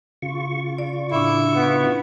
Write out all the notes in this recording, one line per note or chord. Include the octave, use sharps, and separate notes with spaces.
C#3 F4 C#6
D5
A2 D4 E4
B3